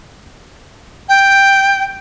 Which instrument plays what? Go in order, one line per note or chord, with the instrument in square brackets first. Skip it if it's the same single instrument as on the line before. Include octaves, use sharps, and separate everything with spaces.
[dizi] G5